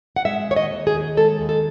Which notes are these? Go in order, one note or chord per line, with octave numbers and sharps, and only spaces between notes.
F#5
G#3 E5
D#2 C#5
D#5
D#2
G#4
D#2
G#3 A4
D#2
A4